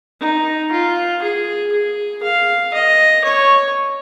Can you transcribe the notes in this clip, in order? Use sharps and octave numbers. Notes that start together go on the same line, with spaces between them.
D#4
F4
G#4
G#4
F5
D#5
C#5